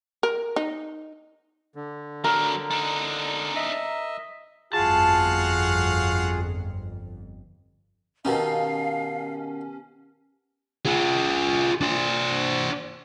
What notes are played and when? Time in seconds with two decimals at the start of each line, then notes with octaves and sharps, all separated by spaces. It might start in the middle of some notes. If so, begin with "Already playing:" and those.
0.23 A#4
0.56 D#4
1.75 D3
2.24 F#3 D4 A#4
2.71 D4 D#4
3.55 D#5 E5
4.73 G1 F2 F4 F#4 G#4 F5 A5
8.25 B2 D#3 B3 C#4 D#4 G4 F5 A5
10.86 F4 G#4
11.81 D4 C5